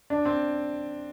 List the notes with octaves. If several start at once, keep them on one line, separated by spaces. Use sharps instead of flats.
D4
C4